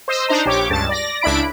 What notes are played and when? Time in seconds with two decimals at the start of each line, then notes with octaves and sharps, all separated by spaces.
0.08 C5 D#5 E6
0.28 D4 D#4 C5 A#5
0.46 A#1 G4 C#5 D6
0.70 C#2 G2 A5 A6
0.89 D5 A#6
1.21 C#2 D4 E4 B5 D7